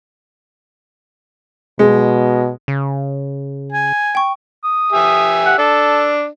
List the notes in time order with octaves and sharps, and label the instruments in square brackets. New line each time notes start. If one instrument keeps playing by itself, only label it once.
[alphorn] B2 [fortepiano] G#3
[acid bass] C#3
[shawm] G#5
[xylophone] G5 C#6
[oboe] D#6
[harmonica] G4 E5 G#5
[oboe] F#5
[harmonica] D4 [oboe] A4